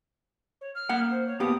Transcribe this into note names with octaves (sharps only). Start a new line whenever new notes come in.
C#5
F6
A#3 F#5
C5
C#5
A#3 B3 G4 D#6